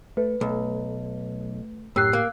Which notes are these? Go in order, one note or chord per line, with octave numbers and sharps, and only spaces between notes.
A3 B4
B1 A3
F#2 A2 G4 E6 F#6 C7
A#3